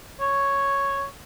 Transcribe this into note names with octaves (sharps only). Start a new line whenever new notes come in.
C#5